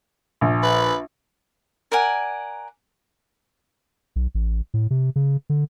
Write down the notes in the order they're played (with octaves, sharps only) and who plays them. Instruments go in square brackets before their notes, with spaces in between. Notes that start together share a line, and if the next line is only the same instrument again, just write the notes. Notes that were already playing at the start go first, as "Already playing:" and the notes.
[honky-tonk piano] A#1
[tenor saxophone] B4
[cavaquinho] A#4 D5 F#5 G#5
[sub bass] B1
A1
A2
C3
C#3
D3